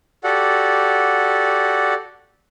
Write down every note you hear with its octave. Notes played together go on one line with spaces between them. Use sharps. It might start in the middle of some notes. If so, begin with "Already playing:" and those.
F#4 G4 A4 D5 F#5